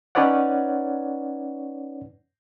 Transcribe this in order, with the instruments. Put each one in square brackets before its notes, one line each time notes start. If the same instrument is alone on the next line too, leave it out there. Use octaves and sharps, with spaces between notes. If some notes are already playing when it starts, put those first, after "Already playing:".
[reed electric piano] C#4 D#4 B4 C#5 D5 F#5